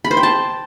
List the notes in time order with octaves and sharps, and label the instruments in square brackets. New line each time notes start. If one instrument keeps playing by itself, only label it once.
[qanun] B5
C5
G5
A5